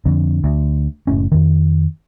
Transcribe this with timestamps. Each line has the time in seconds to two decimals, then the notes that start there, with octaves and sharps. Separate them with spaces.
0.06 F2 D3
0.44 D2
1.07 F#1 A2 C#4
1.32 F2 D#3